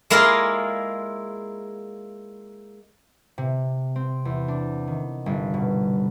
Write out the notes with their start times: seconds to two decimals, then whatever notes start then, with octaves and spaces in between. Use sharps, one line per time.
0.10 G#3 A#3 E4 F4 D#5 F5
3.38 C3
3.96 C4
4.25 E2
4.48 D4
4.87 D#3
5.26 G1
5.54 B2